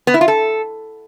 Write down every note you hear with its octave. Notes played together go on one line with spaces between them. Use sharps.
B3
E4
F4
A4